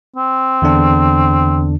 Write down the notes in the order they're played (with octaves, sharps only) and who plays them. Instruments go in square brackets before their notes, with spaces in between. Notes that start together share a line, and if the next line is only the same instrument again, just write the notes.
[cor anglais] C4
[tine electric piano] E2 D3 D4